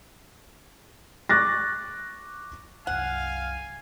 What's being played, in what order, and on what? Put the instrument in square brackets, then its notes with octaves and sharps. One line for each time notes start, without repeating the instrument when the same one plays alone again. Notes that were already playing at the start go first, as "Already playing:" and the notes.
[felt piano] C#6 D6 F#6 A6 A#6
[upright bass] C2 F#2 [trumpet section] F5 [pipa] F#5 [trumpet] G#5